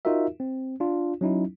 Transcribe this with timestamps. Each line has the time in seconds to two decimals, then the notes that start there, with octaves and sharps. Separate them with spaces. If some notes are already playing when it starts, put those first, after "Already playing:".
0.05 D#4 F4 F#4 A#4 E5
0.40 C4
0.80 D4 F4
1.21 F#3 C#4 D#4 E4